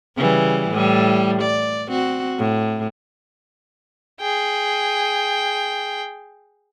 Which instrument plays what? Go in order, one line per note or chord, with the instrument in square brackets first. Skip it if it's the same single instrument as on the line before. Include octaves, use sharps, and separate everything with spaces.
[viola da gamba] C#3 E3 G3
A2 G3
D5
C4 F#4
A2
[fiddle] G#4 G5